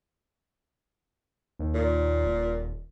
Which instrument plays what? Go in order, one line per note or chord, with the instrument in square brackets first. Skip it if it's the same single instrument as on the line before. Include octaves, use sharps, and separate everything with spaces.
[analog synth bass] D#2
[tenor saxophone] A#2
[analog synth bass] D#1